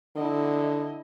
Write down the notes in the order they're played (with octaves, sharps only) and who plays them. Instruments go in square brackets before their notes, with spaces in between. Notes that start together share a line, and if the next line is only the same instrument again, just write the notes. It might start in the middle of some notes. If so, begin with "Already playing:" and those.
[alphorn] D3 [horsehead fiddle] E4 D#5